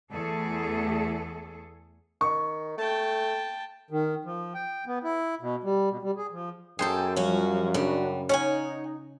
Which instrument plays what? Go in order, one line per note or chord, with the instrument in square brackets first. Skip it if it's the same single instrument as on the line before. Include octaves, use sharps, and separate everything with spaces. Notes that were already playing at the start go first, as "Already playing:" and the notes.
[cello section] E2 A3 G#4 A4
[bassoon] D#3 [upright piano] C#6
[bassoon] A3 [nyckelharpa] G5 A5
[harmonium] D#3
F3
G5
B3
E4
B2
G3
B2
G3
G#4
F3
[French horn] F#2 [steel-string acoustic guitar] A#3 A4 [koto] G#4 C5 [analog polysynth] G5 G#5
[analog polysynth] F3 G3 F5 [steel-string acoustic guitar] C#4 F#4
[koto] C#3 [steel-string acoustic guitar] G3 [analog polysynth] D4 F#4
[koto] C#4 [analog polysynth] D#4 [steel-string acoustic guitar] C#5 F#5 G#5